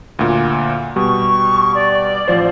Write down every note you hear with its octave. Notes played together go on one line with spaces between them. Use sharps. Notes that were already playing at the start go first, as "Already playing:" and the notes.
D2 A#2
B2 G3 C#6
D5
A1 F3 C5